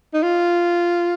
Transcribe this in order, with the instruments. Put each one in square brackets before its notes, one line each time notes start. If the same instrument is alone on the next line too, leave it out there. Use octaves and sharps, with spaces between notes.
[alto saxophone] D#4
F4